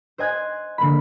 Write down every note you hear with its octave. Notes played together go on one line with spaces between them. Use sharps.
C5 D#5 G#5 F#6 G#6
D3 A#3 B5